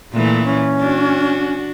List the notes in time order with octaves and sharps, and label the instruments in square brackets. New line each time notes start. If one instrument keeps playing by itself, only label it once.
[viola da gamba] A#2 E3 [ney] A3
[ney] C#4
[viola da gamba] D4 F#4